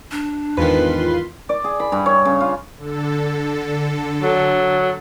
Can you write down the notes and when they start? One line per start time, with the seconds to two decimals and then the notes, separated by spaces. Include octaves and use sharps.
0.11 D4
0.57 E2 G#2 D#3 F4 B4 C6
1.49 D5
1.64 G#4
1.80 B5
1.92 G2
2.06 C#5
2.25 C#3
2.41 F4
2.78 D3 A4
4.22 F#3